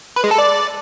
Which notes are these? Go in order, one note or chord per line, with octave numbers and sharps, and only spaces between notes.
B4
G#3
A4
D5